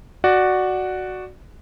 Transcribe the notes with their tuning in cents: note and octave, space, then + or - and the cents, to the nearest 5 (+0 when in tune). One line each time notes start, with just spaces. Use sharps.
F#4 +0 D5 +10